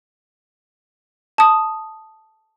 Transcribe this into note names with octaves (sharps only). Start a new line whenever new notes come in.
A5 D#6